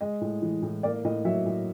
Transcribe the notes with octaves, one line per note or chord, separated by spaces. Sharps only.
G#3 D#5
A2
E3
A2
A#3 D5
A2 D#5
F#3 E5
A2